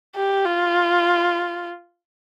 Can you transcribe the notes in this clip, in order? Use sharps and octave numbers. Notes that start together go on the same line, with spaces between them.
G4
F4